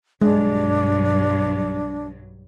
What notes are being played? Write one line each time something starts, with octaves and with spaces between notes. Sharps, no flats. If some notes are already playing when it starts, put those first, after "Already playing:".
B1 G2 F#3 G#3 D4